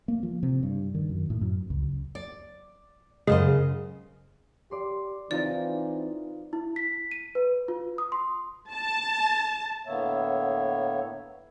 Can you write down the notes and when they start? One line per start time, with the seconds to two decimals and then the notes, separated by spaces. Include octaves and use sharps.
0.08 A#3
0.23 F3
0.43 C3
0.63 G2
0.95 D#3
1.09 F#2
1.30 A2
1.41 F#2
1.70 C#2
2.15 D5
3.27 F#2 C#3 G#3 C5 D#5
4.71 G4 D5 C6
5.31 E3 C4 D#4 F4 D5 A#5
6.53 E4
6.76 B6
7.11 D#7
7.35 B4
7.68 F4
7.98 D#6
8.12 C6
8.72 A5
9.87 A2 D3 A#3 B3 C#5 E5